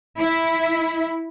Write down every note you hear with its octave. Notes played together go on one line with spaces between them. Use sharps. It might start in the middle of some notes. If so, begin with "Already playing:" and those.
E4